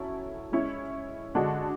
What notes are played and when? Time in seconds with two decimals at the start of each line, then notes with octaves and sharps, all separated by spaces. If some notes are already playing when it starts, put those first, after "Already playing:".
Already playing: F#3 C#4 E4 A4
0.52 G#3 C#4 E4
1.35 D3 G#3 D4 F#4 A4